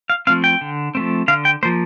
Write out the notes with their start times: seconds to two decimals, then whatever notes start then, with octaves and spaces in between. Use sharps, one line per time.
0.10 F5
0.27 F3 A3 C4 F5
0.44 G5
0.61 D3
0.95 F3 A3 C4
1.28 D3 F5
1.45 G5
1.63 F3 A#3 C5